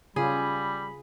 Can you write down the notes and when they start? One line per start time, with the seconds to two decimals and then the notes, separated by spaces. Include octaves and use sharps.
0.16 C#3 G3 C#4 F4 G#4 B5